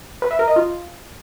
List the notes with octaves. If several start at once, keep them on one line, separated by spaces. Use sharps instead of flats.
B4
E5
A#4
D#5
F4